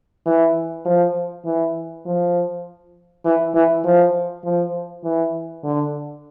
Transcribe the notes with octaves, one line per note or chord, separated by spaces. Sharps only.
E3
F3
E3
F3
E3
E3
F3
F3
E3
D3